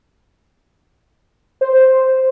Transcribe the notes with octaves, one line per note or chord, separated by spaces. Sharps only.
C5